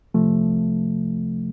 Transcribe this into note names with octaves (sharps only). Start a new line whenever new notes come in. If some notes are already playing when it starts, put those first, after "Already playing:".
C2 C3 F3 A3